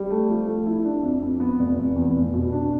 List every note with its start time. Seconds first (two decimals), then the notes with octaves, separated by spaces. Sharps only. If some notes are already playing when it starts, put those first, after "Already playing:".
Already playing: G3
0.10 A3
0.29 F3
0.47 A3
0.66 E4
0.85 D4
1.03 F2
1.22 F2
1.40 B3
1.59 F1
1.78 F1
1.96 E2
2.15 F1
2.33 B2
2.52 D4